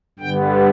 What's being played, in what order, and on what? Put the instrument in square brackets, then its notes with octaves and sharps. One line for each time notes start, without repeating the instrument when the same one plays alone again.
[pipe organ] G2 D3 G3 B3 G5